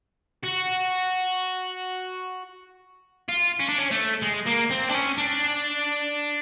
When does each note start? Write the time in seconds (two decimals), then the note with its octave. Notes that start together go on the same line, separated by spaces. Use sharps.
0.44 F#4
3.28 F4
3.60 C#4
3.69 D4
3.78 C#4
3.91 A3
4.22 G#3
4.46 A#3
4.70 C4
4.89 D4
4.94 C#4
5.18 D4